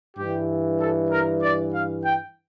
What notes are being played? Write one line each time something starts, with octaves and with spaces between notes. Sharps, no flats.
G2 E3 G4
A4
A#4
D5
F5
G5